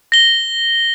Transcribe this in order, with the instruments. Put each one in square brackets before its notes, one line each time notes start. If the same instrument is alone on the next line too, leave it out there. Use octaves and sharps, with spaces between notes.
[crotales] A#6 G7